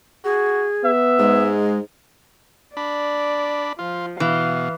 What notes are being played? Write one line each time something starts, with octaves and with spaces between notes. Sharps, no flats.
F#4 G#4
B3 E5
G#2 G#3
D4 D5 B5
F3 F4
B2 E3 F5